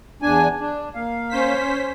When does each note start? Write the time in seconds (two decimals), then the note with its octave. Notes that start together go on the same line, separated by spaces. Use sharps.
0.22 E2 D4 G#5
0.60 D4
0.95 A#3 F5
1.29 C#4 C5 B6